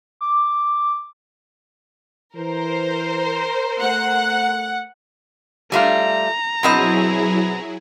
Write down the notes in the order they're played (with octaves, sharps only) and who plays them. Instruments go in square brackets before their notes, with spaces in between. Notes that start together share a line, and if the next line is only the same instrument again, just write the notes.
[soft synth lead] D6
[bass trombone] E3 [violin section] A#4 C5
[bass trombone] A3 [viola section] F#5
[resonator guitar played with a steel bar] G3 A3 F4 [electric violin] A#5
[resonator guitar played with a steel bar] B2 C4 D#5 [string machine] F#3 E4 G#4